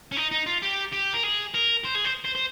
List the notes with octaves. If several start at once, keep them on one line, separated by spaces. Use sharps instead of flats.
C#4
D#4
D#4
F4
G4
G4
A#4
G#4
A#4
C5
G#4
C5
C5
C5